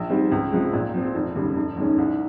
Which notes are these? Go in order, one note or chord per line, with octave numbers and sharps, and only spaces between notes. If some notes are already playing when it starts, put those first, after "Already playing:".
Already playing: A#1
G#2 G3 C4
C#2
C3 F3 G#3
A#2
F3 C4
F1
D#2 C#3 G3
F1
D#2 D#3 G#3 C#4
C2